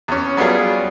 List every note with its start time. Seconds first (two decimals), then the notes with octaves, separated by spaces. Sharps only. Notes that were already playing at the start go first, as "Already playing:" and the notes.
0.08 E2 C#4
0.37 F#3 G3 B3 F4 G#4